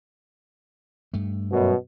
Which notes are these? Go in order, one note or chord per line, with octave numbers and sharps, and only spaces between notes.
G2 A3
F#2 B2